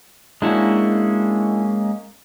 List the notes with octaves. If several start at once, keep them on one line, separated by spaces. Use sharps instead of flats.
G#3 A#3 C#4 D4 E4 F#4